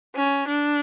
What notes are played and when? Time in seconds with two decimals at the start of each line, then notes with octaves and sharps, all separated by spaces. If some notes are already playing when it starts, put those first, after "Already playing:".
0.15 C#4
0.48 D4